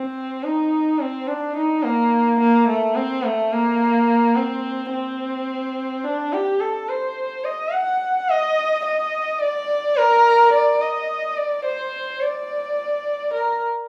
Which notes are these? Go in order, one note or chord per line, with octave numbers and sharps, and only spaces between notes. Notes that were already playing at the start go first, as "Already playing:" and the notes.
Already playing: C4
D#4
C4
D4
D#4
A#3
A#3
A3
C4
A3
A#3
C4
C4
D4
G4
A4
C5
D#5
F#5
D#5
D#5
D5
A#4
D5
D#5
D5
C5
D5
A#4